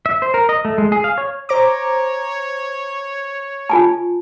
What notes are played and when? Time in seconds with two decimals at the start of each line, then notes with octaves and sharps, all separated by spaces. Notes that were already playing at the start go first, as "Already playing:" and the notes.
0.06 E5
0.22 C5
0.34 A#4
0.49 D#5
0.65 A3
0.78 G#3
0.92 G#4
1.04 F5
1.18 C#5
1.49 C5 C#5 A#5 D6
3.70 F4 G#5 A5